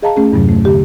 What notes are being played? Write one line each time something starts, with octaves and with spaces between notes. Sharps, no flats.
G#4 D#5 F5 A5 A#5
A3 C#4 G#4
E2 G2 C3 F#3
A3
D3 G4